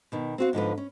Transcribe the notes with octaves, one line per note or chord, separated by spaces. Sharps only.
B2 D#3
C4 F#4 F5
G#2 D3 F3 B4
C#4